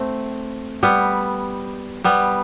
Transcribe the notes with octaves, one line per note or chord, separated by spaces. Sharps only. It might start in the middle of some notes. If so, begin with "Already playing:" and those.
Already playing: A3 C4
G3 B3
G3 B3